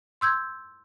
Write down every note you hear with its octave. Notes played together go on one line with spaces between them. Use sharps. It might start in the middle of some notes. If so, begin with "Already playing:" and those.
C6 E6 G6 G#6